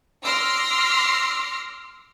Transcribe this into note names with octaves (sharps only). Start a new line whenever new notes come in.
C6 D6 E6 F6 A#6 C7